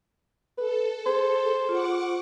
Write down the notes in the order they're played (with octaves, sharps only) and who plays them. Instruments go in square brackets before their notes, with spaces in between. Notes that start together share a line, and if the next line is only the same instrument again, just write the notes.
[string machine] A4 [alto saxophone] B4
[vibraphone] G#4 [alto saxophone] C5
[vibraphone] F4 [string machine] F#5 C#6 D6